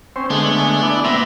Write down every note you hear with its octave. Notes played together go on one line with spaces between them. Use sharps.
C4 C#4 C5
D3 G#3 A3 B3
D4 E4 D5
A#2 B3 C4 E5